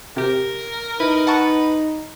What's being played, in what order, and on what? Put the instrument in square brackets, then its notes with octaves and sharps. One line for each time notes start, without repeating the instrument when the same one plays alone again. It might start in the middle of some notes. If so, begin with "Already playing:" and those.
[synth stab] C3 G4 [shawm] A#4
[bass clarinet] D#4 [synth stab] E4 [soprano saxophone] B4
[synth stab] F#5 A5 C#6